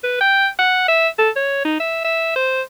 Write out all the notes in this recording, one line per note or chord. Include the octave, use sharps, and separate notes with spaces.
B4
G5
F#5
E5
A4
C#5
D#4
E5
E5
C5